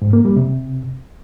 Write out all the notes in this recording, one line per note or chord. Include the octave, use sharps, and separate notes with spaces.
G#2
A#3
G3
C3